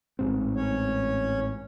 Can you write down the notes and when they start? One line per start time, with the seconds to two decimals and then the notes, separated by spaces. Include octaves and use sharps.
0.19 A1 G#2 C4
0.56 C#4 C#5